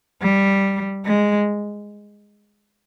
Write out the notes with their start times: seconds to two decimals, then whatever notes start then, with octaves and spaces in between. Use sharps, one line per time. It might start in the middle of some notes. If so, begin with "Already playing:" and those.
0.22 G3
1.06 G#3